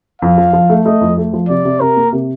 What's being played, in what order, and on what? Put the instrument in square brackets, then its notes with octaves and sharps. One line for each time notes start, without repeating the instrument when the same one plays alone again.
[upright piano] F2 [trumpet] F5
[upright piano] F3
F3
A3
[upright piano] A3 [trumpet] D#5
[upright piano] F2
A3
F3
[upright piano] C3 [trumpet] D5
[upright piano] C3
[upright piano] C3 [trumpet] A#4
[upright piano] A#3
C3